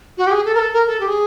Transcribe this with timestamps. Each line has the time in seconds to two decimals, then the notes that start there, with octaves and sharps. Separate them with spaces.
0.18 F#4
0.27 G4
0.31 G#4
0.45 A4
0.55 A#4
0.59 A4
0.73 A#4
0.87 A4
1.00 G4
1.08 G#4